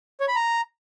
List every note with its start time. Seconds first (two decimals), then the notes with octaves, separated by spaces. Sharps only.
0.20 C#5
0.28 B5
0.36 A#5